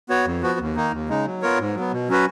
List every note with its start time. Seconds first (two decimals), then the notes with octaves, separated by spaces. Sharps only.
0.09 B3 F#4 C#5
0.25 F2
0.42 F3 B3 F#4
0.59 D#2
0.75 D#3 A#3 D#4
0.93 D#2
1.09 C#3 G#3 D#4
1.26 F#3
1.42 B3 F4 A#4 C#5
1.59 G#2
1.76 F#3 B3
1.92 B2
2.09 F#3 C#4 F#4 B4